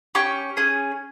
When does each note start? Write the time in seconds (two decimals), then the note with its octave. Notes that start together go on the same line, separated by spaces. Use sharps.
0.15 C#4 G4 C#6
0.57 C#4 G#4